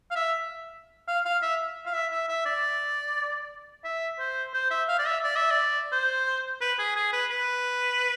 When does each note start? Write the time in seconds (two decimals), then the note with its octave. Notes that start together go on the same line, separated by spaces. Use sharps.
0.11 F5
0.16 E5
1.08 F5
1.25 F5
1.42 E5
1.86 F5
1.94 E5
2.12 E5
2.29 E5
2.46 D5
3.84 E5
4.19 C5
4.54 C5
4.71 E5
4.88 F5
4.99 D5
5.06 E5
5.23 D5
5.36 E5
5.51 D5
5.92 C5
6.61 B4
6.79 G#4
6.96 G#4
7.13 B4
7.30 B4